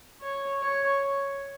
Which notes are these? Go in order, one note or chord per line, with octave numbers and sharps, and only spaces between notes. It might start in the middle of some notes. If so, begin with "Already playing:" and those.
C#5
C#5